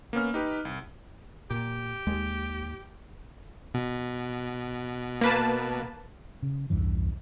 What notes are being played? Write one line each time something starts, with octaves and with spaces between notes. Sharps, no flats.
A#3 B3 C#4 F6
D#4 G4 B4
C2
A#2 G4
D#2 G#3
B2
A#3 B4 A5
C#3
B1 E2 G2 E3